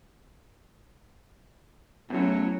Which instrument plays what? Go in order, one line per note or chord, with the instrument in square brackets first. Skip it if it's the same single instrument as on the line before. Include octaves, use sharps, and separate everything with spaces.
[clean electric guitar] E2 A2 [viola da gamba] F#3 C#4